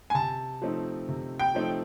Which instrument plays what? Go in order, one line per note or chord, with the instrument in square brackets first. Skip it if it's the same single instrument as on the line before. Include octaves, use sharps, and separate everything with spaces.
[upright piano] G#5
[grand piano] C3 [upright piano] A5
[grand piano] F3 A3 C4 D#4
C3
[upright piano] G5
[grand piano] F3 A3 C4 D#4